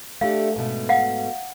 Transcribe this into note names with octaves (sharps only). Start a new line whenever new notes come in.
A3 D4 G4 F5
G#2 B2 A3
F5 F#5